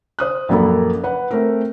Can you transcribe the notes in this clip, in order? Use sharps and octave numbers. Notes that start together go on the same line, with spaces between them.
C5 D#6 F#6
A#1 F#2 A#3 A4 B5
B4 F#5
A3 C4 A#4